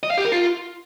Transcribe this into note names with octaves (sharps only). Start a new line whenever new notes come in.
D#5
F5
G4
A#4
F4